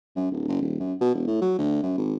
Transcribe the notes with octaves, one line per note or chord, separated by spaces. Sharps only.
F#2
D1
F#1
D#1
F#2
B2
E1
A2
F#3
D2
F#2
G#1